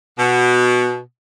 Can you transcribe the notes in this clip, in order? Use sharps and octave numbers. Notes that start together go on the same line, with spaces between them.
B2